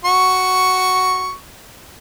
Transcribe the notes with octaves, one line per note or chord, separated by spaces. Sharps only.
F#4 C#6